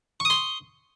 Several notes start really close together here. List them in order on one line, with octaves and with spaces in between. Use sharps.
C#6 D#6 C6